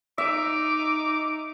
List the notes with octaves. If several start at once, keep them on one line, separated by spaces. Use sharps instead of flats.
D#4 E5 D6